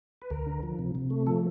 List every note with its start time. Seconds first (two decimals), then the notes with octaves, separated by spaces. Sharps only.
0.22 B4
0.30 D2 A#4
0.46 D3
0.63 F3
0.79 C3
0.95 C3
1.10 A3
1.27 F3 A4